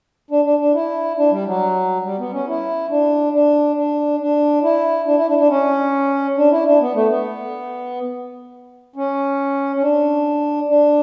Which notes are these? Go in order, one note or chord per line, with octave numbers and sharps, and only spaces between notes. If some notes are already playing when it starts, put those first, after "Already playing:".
D4
D4
D4
E4
D4
G3
F#3
G3
B3
C#4
E4
D4
D4
D4
D4
E4
D4
E4
D4
D4
C#4
D4
E4
D4
B3
A3
B3
C#4
C#4
D4
D4